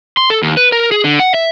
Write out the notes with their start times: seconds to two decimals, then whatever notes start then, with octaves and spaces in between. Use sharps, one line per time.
0.17 C6
0.30 A4
0.43 D#2
0.57 B4
0.72 A#4
0.92 G#4
1.04 D3
1.20 F#5
1.34 E5